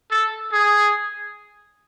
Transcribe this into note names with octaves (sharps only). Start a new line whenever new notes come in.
A4
G#4